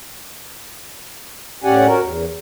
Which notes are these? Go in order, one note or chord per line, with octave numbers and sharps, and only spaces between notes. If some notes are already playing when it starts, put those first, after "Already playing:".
A2 C#4 G4 D5 F#5 G#5
F#4 A#4
E2